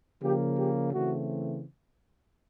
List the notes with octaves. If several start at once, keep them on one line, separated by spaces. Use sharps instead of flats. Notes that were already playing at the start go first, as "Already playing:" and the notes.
C#3 F3 A#3 G4
G4
C#3 E3 A3 C4 F#4